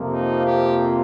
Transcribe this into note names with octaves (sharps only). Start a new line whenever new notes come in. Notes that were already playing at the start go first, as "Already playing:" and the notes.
Already playing: F2 C3 F3 A#3
D#4
G4